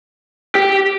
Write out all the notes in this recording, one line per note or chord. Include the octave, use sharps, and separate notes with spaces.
G4